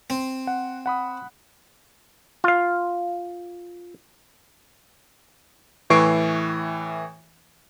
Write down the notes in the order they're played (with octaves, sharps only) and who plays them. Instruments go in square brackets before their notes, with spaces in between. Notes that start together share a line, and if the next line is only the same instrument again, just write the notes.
[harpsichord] C4
[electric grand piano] F#5
F#5 B5 D#6
[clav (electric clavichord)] F4 F5
[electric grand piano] A2 E3 C#6 C7 D7